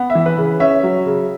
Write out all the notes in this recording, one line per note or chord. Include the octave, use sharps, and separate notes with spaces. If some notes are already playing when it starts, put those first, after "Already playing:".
Already playing: B3
E5
E3
B4
C#3
C#4 E5
F#3
C#3